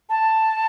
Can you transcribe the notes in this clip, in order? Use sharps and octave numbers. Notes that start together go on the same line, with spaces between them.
A5